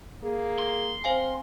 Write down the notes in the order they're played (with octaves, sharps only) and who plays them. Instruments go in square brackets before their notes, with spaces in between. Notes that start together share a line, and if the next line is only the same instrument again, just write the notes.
[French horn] A#3 [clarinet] G#4
[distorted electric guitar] C6
[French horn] C4 [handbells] C5 F5 G#5